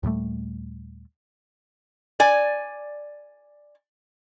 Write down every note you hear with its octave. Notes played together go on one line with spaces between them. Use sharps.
D#2 A#2 G3 A3
D5 G#5